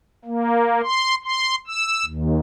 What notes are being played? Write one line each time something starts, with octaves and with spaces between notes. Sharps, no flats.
A#3
C6
C6
E6
D#2